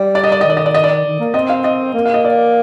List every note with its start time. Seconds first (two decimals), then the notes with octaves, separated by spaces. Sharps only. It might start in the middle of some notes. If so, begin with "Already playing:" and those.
Already playing: G3
0.15 D5
0.24 D#5
0.32 D5
0.41 D#5
0.45 D#3 D5
0.57 D#5
0.66 D5
0.74 D#5
0.84 D5
1.05 D#3
1.19 A#3
1.34 C4 D#5
1.49 F5
1.64 D#5
1.94 A#3
2.05 F5
2.14 D#5
2.24 D5